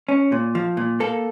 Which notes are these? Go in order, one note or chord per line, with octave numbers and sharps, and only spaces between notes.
C#4
A#2
F3
A#2
A#3 A4